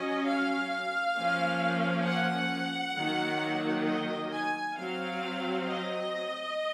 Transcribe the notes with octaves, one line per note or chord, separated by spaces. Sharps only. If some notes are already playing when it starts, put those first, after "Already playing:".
Already playing: F#3 C#4 D#5
F5
F3 A#3 C#4
F#5
D#3 F#3 A#3
D#5
G#5
F#3 C4 F5
D#5